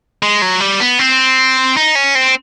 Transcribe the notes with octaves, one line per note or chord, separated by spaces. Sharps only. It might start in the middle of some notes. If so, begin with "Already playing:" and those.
G#3
F#3
G3
B3
C4
D#4
C#4
C4